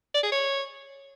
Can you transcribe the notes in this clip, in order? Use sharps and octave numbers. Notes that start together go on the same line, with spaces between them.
D5
G#4
C#5